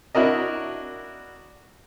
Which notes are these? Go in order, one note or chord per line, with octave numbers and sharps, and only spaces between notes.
D4 E4 F#4 A#4 D#5